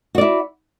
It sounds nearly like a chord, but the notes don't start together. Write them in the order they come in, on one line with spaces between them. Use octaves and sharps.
F#4 D5 E4